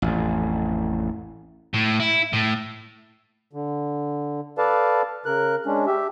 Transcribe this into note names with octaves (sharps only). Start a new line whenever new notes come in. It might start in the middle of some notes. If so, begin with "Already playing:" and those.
A1 F2
A2
E4
A2
D3
A4 B4 D5 F5 A5
C#3 A#4 F#6
G#3 C#4 D4
G4 E5